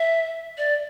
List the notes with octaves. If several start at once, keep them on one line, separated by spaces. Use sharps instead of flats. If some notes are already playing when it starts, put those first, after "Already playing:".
Already playing: E5
D5